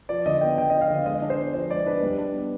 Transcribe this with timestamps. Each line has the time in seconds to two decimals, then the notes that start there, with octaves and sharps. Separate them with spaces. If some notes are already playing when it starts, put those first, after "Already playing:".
0.09 F3 D5
0.26 D3 D#5
0.41 B3 G5
0.57 D3 G5
0.70 F3 D#5
0.81 F5
0.90 D3
1.06 G#3 D#5
1.22 D4
1.30 C5
1.39 B3
1.54 F3 C5
1.70 G#3 D5
1.86 D4 B4
2.03 G3
2.18 D4
2.35 B3